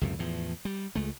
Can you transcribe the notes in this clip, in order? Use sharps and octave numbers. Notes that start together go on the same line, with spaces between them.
C#2 F#2 C3
E2 A2 F3
G3
C#2 G#3 A3